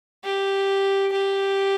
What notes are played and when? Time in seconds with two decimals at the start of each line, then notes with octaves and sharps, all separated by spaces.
0.25 G4
1.13 G4